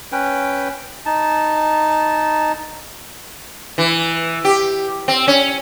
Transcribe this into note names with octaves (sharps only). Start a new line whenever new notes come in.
C#4 B4 G5
D#4 A5
E3
G4
C4
C#4